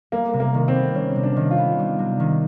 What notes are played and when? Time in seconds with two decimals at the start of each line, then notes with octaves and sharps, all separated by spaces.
0.12 G3 A#3
0.33 C3
0.40 A#3
0.54 D#3
0.68 C4
0.75 B3
0.95 G3 C#4
1.16 C3
1.23 D4
1.36 D#3
1.51 F4
1.58 B3
1.79 G3
1.99 C3
2.20 D#3